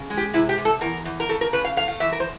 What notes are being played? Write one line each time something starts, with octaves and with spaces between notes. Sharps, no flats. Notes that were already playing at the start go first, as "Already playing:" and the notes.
Already playing: C#3
G#3
G4
C3 E4
G4
C3
A4
E2 A#4
E2
A#4
C#3 A4
A#4
C#3 B4
F5
A3 F5
F5
E3 E5
A#4
C5